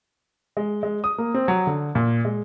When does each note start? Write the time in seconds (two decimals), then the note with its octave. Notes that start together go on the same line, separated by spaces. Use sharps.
0.57 G#3
0.83 G#3
1.04 D#6
1.18 A#3
1.34 C4
1.48 F#3
1.67 D3
1.95 A#2
2.25 G#3